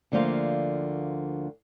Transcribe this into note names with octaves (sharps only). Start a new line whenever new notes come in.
D2 D3 F3 A#3 C5 F5